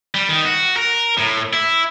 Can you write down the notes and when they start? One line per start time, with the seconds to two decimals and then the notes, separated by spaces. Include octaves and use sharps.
0.15 G3
0.29 D#3
0.45 F#4
0.77 A#4
1.18 A2
1.53 E4